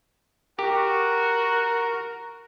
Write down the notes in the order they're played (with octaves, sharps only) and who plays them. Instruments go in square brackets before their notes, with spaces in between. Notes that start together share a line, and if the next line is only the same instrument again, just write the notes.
[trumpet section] F#4 [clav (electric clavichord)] G4 [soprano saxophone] A#4